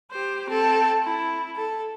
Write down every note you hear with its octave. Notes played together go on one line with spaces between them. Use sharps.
G4 C5
C4 A4
E4
A4